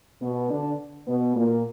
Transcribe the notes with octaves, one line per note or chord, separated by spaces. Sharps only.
B2 B3
D3 D4
B2 B3
A#2 A#3